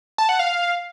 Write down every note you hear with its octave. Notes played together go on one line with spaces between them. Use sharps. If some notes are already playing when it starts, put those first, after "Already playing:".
A5
F#5
F5